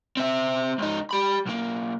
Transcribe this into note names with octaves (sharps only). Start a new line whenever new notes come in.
C4 E5
C#2 D#4
G4 B5
B1 A#3